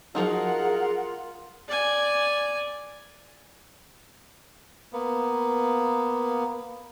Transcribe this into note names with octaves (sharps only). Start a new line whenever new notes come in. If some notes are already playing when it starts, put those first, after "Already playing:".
F3 F#3 D#4 F4 G#4 A#4 F#5
D5 G#5
A#3 B3